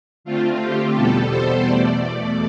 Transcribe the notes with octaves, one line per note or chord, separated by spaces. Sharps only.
D3 A3 C4 F4
G4
E2 B2 G3 B3 A4
C5
E2 B2 A3 D5